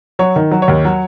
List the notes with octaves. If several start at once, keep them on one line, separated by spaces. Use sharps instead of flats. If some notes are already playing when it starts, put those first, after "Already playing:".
F#3 C#5
D#3
F#3
C#5
D#2
F#3